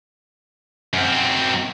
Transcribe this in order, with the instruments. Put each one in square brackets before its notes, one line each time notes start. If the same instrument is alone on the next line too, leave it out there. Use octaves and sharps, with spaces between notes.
[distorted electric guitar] F#2 C4